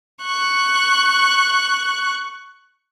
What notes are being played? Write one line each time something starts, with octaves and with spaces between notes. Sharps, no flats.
C#6 F#6